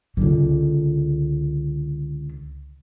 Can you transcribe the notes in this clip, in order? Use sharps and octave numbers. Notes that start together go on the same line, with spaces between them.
C#2 D3